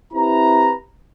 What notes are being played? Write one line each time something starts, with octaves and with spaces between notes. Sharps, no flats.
C4 E4 G4 B4 A#5